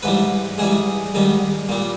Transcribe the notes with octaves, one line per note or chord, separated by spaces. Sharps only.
G#2 E3 G3 B4
G#2 E3 G3 G#4
G#2 D#3 G3
A#2 G3